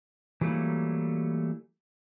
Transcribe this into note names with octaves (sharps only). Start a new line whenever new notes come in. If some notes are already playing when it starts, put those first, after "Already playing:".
E3 F#3 G3 A3 A#3 E4